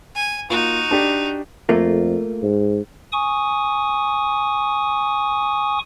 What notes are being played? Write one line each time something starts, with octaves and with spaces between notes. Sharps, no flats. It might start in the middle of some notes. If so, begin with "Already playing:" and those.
G#5
A#3 D#4 F4 F#4
D4 G4
F2 A3 A#3 F4
G#2
G#5 C#6 D#6